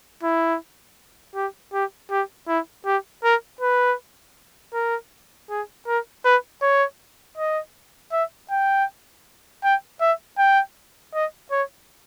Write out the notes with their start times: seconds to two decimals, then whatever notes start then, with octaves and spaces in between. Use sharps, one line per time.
0.23 E4
1.35 G4
1.73 G4
2.11 G4
2.48 E4
2.86 G4
3.24 A#4
3.61 B4
4.74 A#4
5.50 G#4
5.87 A#4
6.25 B4
6.62 C#5
7.38 D#5
8.12 E5
8.51 G5
9.64 G5
10.01 E5
10.38 G5
11.14 D#5
11.51 C#5